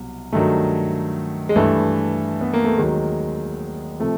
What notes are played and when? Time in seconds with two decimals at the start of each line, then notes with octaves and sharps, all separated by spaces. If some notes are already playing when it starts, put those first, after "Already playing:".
Already playing: C2 B2 F#3
0.33 G2 D#3 F#3 A3
1.49 G#3
1.56 G2 E3 A3
2.41 B3
2.54 A#3
2.65 A3
2.77 D#2 D#3 F#3 G#3
4.00 C3 F3 A3